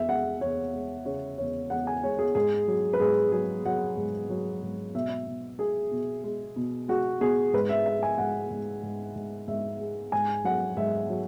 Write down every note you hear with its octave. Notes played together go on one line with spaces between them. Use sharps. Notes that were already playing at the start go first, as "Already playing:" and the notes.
Already playing: E2 E5
G#3 F#5
E2 C#5
G#3
C#3 C#5
E2 C#5
E2 F#5
G#5
G#3 C#5
G#4
G#2 G#4
F#3
B4
G#2 G#4
F#3 G#4
F#3 F#5
G#2
F#3
G#2
B2 E5
B2
G#3 G#4
B2
G#3
B2
G#3 F#4
B2 G#4
G#2 B4
E5
G#3 E5
G#5
G#2 F#5
G#2
G#2
G#2
G#2 E5
G#3
G#2 G#5
F#3 F#5
G#2 E5
F#3